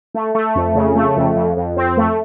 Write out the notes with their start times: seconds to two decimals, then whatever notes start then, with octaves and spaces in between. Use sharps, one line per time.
0.14 A3
0.35 A3
0.55 F2
0.75 C#3
0.95 A3
1.17 F2
1.36 F2
1.57 F2
1.77 C4
1.97 A3